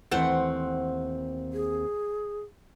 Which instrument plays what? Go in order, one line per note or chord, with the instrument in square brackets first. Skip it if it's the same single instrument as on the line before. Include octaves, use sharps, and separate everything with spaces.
[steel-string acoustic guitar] D#2 C4 [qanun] E3 A3 C5 [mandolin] F#5
[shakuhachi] G#4